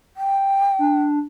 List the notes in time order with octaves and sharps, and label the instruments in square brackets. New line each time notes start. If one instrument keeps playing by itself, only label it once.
[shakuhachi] G5
[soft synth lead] D4